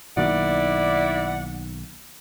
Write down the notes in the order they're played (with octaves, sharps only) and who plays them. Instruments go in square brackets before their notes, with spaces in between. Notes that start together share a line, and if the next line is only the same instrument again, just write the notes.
[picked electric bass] B1 D#3 A#3 [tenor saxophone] E4 [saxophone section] D5 [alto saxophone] F#5